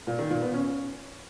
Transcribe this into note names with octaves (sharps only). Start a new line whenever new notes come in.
A#2
D#3
A#2
B3
C#4